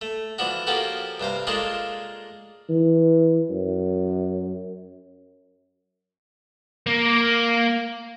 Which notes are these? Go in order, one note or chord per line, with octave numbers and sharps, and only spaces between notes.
A3
E3 F3 D4 F#4
F3 A#3 C#4 F#4 G4 A4
G2 C3 C5 F5
G#3 A#3 D4 F4 G#4 A4
E3
F#2
A#3